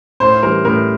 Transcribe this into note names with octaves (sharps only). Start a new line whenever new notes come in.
A2 C5
E3 G3 A#4
A2 A#4